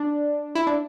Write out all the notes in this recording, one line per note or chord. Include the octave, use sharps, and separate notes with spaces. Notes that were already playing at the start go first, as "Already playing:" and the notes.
Already playing: D4
E4
D4